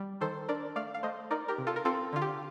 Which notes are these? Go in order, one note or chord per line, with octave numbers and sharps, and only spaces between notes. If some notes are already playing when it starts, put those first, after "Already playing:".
Already playing: G3
D#3 A4 C5
D4 A#4 D5
A3 D5 F5
F5
A3 C5 D#5
D#4 A#4 D5
G4 A#4
C3
F4 A4
A#4
C4 F4 A4
D3 F4
G4